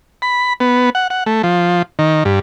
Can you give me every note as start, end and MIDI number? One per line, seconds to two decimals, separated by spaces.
0.22 0.53 83
0.60 0.90 59
0.95 1.08 78
1.10 1.24 78
1.26 1.42 57
1.43 1.82 53
1.99 2.24 51
2.25 2.39 43